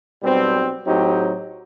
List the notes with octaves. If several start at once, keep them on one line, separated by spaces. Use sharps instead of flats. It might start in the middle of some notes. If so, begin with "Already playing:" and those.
B1 B2 G3 C4
A2 F#3 C4 D#4 G4